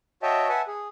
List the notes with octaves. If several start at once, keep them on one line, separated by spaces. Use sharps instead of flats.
F#4 C#5 D#5 E5 G5 A5
B4 E5 F#5 G#5 A5
G#4